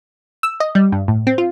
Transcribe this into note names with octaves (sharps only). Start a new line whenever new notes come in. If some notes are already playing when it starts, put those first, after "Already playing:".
E6
D#5
G3
G2
A2
C4
F4